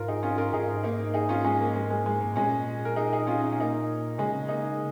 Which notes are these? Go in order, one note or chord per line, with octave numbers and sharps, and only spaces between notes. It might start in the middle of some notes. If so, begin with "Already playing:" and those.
Already playing: G#2 F4 A#4
D#4 G#4
C#4 F4
F4 A#4
G#2 D#4 G#4
A#3 D#4
D#4 G#4
C#4 F4
G#3 C#4
A#3
G#3
G#3
G#3
G#2 A#3
A#2 G#3 C#4
A#4
D#4 G#4
D#4 G#4
C#4 F4
D#4
C#4
A#3 D#4
C#3 G#3 C#4
A#3 D#4